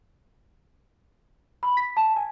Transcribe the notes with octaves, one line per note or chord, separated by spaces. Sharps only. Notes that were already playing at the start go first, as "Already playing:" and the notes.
B5
B6
A5
G#5